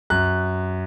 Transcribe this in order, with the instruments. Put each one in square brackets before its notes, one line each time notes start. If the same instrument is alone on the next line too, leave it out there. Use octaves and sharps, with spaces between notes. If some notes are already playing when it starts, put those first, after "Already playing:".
[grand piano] F#2 F#6